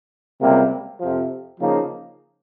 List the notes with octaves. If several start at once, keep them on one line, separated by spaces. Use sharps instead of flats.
C#2 C3 G3 A#3
F2 C3 F3
C#3 F3 A#3 D#4